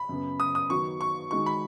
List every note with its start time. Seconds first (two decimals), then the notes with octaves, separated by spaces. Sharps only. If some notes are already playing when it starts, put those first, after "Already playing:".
Already playing: B5
0.09 F#2 C#3 B3
0.40 D#6
0.55 D#6
0.70 D#3 F#3 B3 F#4 C#6
1.01 C#6
1.31 D#3 G#3 D#4 F#4 C#6
1.46 B5